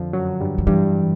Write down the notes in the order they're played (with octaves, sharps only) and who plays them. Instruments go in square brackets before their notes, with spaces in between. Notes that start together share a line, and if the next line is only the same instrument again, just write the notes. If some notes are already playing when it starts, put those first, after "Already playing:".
Already playing: [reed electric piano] F2 F3 [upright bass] D3
[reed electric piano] F#2 F#3
G2 G3
[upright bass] F3
[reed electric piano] G2 G3 [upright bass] E3